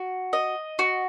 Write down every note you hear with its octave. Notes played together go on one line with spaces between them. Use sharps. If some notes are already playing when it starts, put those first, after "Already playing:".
Already playing: F#4
D#5
F#4